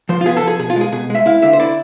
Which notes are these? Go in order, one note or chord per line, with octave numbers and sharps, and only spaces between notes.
F3 C5
F4
B3 G#4
A4
F3 G#4
B2 G#4
F4
G#3 G#4
B2 G#4
G#3 E5
E4 F5
D3 E5
C5
E4 D5